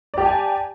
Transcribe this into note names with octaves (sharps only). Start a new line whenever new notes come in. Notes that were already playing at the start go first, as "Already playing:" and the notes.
G4 D5 G#5 A5